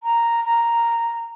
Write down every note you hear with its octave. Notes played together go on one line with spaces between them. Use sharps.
A#5
A#5